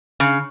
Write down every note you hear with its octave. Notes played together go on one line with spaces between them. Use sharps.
C#3